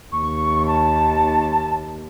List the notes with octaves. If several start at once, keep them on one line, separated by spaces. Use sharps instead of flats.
D#2 C#6
A5